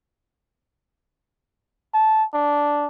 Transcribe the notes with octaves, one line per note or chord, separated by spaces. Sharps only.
A5
D4